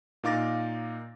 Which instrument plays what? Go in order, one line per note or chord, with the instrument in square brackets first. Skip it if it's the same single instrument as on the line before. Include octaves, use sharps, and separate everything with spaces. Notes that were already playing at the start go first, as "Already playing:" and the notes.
[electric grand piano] A#2 D#4 F5 D6 A6 A#6